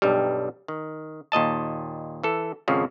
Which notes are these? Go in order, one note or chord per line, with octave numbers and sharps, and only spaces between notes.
B1 G2 G3
D#3
D#2 A#2 D#5 A5
E3 A4
G#1 F2 C#3 F3